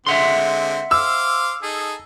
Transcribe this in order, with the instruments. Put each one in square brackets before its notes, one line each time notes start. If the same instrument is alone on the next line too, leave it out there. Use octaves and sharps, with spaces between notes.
[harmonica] D3 G#3 C4 [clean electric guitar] E5 F#5 C6
[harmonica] C5 F5 D6 [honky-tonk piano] E6
[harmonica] D#4 G#4 A4